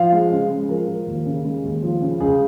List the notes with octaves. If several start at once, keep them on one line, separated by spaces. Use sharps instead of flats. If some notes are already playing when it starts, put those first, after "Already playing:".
Already playing: F3 F5
G#3
C#3
G#3
F3 A#4
F3
D#2
C#3
G#3
D#2
F3
C#3
C#2 G#4